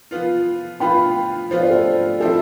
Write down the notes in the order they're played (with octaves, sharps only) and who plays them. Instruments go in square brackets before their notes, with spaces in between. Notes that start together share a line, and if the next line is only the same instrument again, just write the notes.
[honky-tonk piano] F3 B3 F4
[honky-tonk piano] F3 B3 F4 [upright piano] G5 B5
[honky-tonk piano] F3 B3 F4 [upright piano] C5
[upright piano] D5
A4 C5
[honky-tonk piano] F3 C4 E4 [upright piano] A4